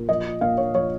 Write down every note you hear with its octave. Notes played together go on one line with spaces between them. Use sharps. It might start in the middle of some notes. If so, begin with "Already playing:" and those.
Already playing: A#2
F3 D#5
A#2 F5
C#5
F3 C#5